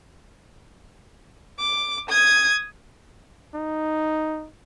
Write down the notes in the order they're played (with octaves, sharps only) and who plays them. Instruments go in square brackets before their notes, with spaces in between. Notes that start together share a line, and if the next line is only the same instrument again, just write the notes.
[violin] D6
D#6 G#6
[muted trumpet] D#4